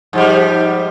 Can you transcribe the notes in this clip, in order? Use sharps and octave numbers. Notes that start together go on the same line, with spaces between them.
G#2 F3 G3